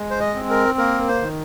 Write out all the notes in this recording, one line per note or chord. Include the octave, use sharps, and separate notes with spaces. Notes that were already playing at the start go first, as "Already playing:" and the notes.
Already playing: G#3
C5
D#5
C4
A#4
A#3 A#4
C5
D#3